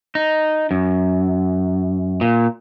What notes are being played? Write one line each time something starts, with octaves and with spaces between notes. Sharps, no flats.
D#4
F#2
A#2